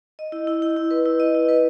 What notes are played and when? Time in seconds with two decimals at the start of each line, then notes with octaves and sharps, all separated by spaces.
0.19 D#5
0.32 E4
0.47 E4
0.62 E4
0.76 E4
0.91 B4
1.06 E4
1.20 D#5
1.35 E4
1.49 B4